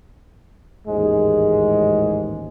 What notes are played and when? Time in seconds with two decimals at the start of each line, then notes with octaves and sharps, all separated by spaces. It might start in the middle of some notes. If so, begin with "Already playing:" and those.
0.87 A1 D#2 G#2 G#3